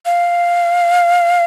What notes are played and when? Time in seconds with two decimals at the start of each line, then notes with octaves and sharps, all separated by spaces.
0.05 F5